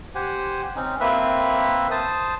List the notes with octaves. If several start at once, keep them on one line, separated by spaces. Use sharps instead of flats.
G4 C5 F#5 G#5
C4 C#4 D#4
A#3 C4 B4 E5
C5 A5 D#6